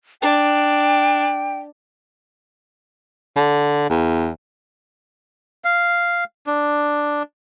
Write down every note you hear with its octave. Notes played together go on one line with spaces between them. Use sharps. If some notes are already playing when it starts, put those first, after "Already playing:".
D4 G5
D3
E2
F5
D4